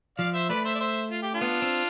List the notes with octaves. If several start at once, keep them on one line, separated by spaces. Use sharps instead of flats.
F3 D5 F5
C5 E5
A3 B4 D5
C5 E5
D5
C5 E5
F4
G4
D4 F4
B3
C4